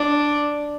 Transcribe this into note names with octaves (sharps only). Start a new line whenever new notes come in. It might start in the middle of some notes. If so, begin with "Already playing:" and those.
Already playing: D4